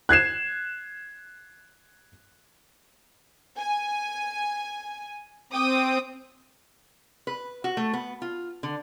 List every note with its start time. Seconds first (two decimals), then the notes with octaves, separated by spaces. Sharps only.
0.09 F#6 G#6 C7 E7
3.58 G#5
5.52 C4 G5 D6 D#6
7.27 B4
7.64 F#4
7.77 A3
7.93 B3
8.22 F4
8.63 D3